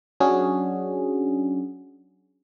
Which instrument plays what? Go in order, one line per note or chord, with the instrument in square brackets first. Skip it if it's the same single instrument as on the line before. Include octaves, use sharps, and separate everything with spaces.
[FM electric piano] F#3 C#4 D4 F#4 G#4